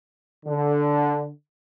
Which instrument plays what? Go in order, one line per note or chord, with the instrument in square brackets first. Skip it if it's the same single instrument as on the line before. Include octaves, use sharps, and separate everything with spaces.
[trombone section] D3